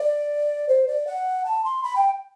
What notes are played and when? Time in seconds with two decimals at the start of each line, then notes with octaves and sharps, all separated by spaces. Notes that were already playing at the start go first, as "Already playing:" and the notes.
Already playing: D5
0.68 C5
0.88 D5
1.07 F#5
1.45 A5
1.65 C6
1.83 B5
1.96 G5